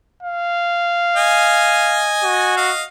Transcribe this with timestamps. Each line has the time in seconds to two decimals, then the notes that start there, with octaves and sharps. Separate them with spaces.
0.23 F5
1.17 D#5 G#5
2.24 F#4
2.57 D#5 F5